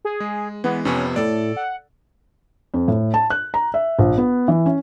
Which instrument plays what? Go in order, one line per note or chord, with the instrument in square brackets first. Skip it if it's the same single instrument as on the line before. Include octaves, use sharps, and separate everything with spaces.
[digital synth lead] G#4
[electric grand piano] G#3
[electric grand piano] E3 G#3 [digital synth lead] B3
[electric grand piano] F2 C3 B3 [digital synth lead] C#4
[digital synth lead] A2 [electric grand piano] A4 D5
[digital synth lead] F#5
[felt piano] F2
A2
A5
F#6
A#5
E5
A#1
B3
E3
C#4